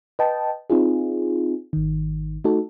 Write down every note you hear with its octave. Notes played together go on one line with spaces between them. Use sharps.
B4 D#5 G5 A5
C4 D#4 F4 G#4
G#1 D#3
A3 D#4 F#4 A4